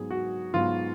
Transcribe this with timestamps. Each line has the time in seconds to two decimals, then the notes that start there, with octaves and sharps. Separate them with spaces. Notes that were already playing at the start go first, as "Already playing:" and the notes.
Already playing: G#2 F#3 B3 G#4
0.11 F#4
0.54 G#2 F#3 B3 F4